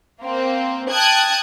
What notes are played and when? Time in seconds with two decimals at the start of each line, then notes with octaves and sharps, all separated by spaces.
0.22 A#3 C4
0.91 G5 A5 D#6 F#6 G#6